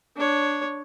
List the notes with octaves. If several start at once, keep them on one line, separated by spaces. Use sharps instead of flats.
D4 C#5